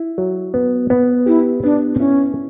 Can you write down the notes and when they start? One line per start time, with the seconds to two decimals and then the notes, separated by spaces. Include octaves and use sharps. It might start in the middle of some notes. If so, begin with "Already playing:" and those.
Already playing: E4
0.18 F#3
0.54 B3
0.90 B3
1.26 E4 G4
1.64 B3 D4
1.95 C4
1.99 C#4 E4